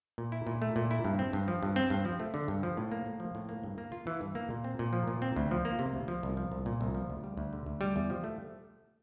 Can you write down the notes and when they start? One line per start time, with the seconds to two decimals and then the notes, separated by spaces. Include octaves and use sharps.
0.18 A#2
0.32 E4
0.47 A#2
0.62 A3
0.76 A#2
0.91 E4
1.05 G2
1.19 C4
1.33 G2
1.48 F3
1.63 G2
1.76 C4
1.90 G2
2.05 F3
2.20 A3
2.34 D3
2.48 G2
2.63 F3
2.77 A2
2.92 A#3
3.06 A2
3.20 F3
3.35 A2
3.49 A#3
3.63 G2
3.78 A#3
3.92 F4
4.07 E3
4.21 G2
4.35 A#3
4.50 A#2
4.64 C4
4.79 A#2
4.93 F3
5.08 A#2
5.22 C4
5.36 D2
5.51 F3
5.65 A#3
5.79 C3
5.94 D2
6.08 F3
6.23 C2
6.37 F3
6.52 C2
6.66 A#2
6.81 C2
6.95 F3
7.10 D2
7.24 G3
7.37 D2
7.53 D3
7.66 D2
7.81 G3
7.96 E2
8.10 F3
8.24 A3